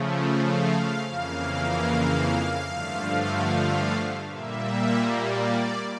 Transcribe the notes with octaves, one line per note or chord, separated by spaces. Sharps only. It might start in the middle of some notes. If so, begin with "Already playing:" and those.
Already playing: C#3 F3 A3
F5
F2 C#3 E3 A#3 F5
G2 D3 F3 A3
A#2 G3 A#3 E5
D5